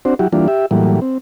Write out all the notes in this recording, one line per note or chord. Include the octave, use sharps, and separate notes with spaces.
C4 D4 F#4 C5
F#3 E4 F#4 G4
E3 G3 A#3 D4 F4
G4 E5
A2 E3 F#3 G3 A#3
C4